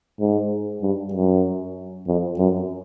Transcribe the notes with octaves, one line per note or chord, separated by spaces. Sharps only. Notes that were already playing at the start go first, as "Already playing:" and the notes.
G#2
G2
F#2
F2
F#2